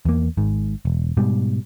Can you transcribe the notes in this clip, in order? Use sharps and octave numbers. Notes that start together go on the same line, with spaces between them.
E2 A#3
G#1 G#2
E1
G#2 B2 G3